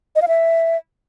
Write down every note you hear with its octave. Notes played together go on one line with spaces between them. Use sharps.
D#5
F5
E5